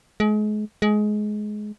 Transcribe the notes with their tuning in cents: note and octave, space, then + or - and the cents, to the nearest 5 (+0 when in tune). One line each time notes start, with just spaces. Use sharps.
G#3 +35
G#3 +20